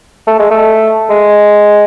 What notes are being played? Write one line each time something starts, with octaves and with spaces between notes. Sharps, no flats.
A3
G#3
A3
G#3